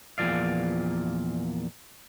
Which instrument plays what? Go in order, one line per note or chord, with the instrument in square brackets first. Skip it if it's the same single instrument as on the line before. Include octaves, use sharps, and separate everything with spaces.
[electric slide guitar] E2 A#2 D#3 F3 D5 F5